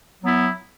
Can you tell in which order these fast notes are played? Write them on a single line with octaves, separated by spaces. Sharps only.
F#3 B3 E4